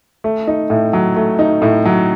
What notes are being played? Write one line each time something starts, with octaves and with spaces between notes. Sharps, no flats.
A3
D#4
A2
F#3
A3
D#4
A2
F#3